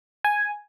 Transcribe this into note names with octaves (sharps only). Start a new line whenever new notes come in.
G#5